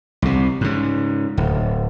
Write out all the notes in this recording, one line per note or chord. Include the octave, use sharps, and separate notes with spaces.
C2 C3
G#2 C#3
D1